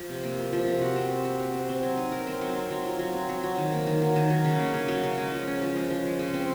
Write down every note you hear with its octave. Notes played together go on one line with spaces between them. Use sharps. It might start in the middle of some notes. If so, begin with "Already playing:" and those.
Already playing: F3
C3
A#3
F4
F3
C3
F#4
C4
C5
C4
F#4
C4
C4
F#3
D#4
A#4
C4
F#3
C4
F#3
F4
F#3
C4
F#3
F#3
D#3
A#3
D#3
F#3
D#3
F#3
C#3
A#3
C#3
F#3
C#3
G#3
F3
C#4
F3
G#3
F3
G#3
C#3
C4